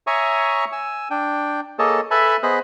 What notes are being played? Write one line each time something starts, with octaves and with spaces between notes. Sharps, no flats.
C#5 E5 G#5 A#5 C#6 D#6
G#5 E6
D4 G5
A#3 G#4 A4 C#5 D#5 A5
A4 B4 E5 G#5 A5 B5
B3 G#4 C5 D#5 B5 F#6